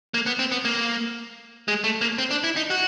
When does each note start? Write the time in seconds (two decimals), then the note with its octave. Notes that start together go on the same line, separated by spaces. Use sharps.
0.14 A#3
0.26 B3
0.39 C4
0.51 B3
0.65 A#3
1.68 G#3
1.84 A3
2.01 A#3
2.18 C4
2.31 D4
2.44 E4
2.56 D#4
2.70 F#4